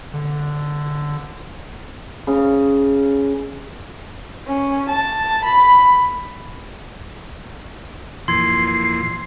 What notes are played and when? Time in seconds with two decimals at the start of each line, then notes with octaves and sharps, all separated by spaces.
0.14 D3
2.27 C#3
4.47 C#4
4.89 A5
5.44 B5
8.28 F2 A#2 E3 C6 G#6 C7